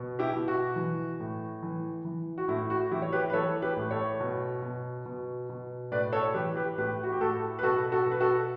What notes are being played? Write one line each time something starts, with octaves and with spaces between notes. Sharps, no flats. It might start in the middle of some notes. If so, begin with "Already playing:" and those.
Already playing: B2
E4 G4
B2
F#4
E3
A2
E3
E3
F#4
A2 E4
F#4
E3 E4 G4
C#5
G4 B4
B4
E3 A4 C#5
G4 B4
A2
A4 C#5
B2
B2
B2
B2
A2 B4 D5
A4 C#5
E3 G4 B4
G4 B4
A2 G4 B4
F#4
G4
A2 F#4 A4
B4
B2 F#4 A4
F#4 A4
B2
B4
F#4 A4